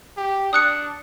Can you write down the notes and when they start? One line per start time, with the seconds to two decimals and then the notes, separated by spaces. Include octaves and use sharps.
0.17 G4
0.53 D4 D#6 F#6 C#7